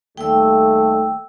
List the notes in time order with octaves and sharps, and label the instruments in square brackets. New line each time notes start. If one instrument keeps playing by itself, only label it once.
[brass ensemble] D#2 G3 A3 [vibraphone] G5 E6